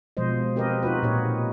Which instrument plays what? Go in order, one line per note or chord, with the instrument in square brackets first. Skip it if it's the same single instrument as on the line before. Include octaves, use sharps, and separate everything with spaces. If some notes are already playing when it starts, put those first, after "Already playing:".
[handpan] B2 F3 G#3 C5 D#5
C4 G4 A#4 B4 D#5
D#4 F4 F#4 B4
A#2 D#4 G4 C#5